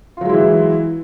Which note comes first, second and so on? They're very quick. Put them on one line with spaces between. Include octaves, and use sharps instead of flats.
F4 F#3 G#3 E4 E3